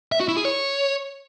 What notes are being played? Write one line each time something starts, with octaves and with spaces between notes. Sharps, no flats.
E5
F#4
E4
G#4
C#5